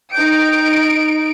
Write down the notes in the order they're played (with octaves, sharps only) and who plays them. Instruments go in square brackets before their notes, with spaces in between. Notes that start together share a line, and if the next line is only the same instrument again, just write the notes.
[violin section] D#4 D7 [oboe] G5